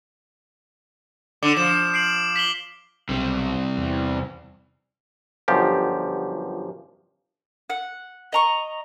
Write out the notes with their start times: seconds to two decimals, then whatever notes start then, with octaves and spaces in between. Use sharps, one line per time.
1.43 D3 D6 E7
1.57 F3 D6 E7
1.94 C7 D7 F#7
2.36 B6 F#7 G7
3.09 B1 C3 G3
3.78 E2
5.48 G1 F#2 F3 G4
7.70 F#5
8.32 D#5 A#5 C#6